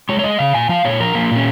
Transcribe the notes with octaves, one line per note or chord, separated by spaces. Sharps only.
G#3 C#5
C#5
G#3 D#5
C#3 F5
A#2 G#5
F3 F5
A#2 C#5
F3 A#4
F3 A#3
A#2 C#4